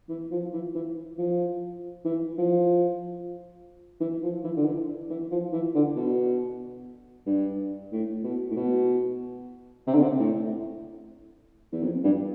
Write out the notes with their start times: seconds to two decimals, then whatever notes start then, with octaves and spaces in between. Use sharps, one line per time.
0.09 E3
0.32 F3
0.53 E3
0.75 E3
1.18 F3
2.05 E3
2.38 F3
4.00 E3
4.23 F3
4.44 E3
4.56 D3
4.66 E3
5.10 E3
5.31 F3
5.53 E3
5.75 D3
5.96 B2
7.26 G2
7.92 A2
8.24 B2
8.50 A2
8.56 B2
9.87 C3
9.95 D3
10.03 C3
10.20 A2
11.72 E2
11.83 F2
12.04 G2